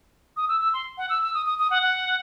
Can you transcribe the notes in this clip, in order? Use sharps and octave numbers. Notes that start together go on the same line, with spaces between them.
D#6
E6
E6
C6
F#5
E6
E6
D#6
D#6
D#6
F#5
F#5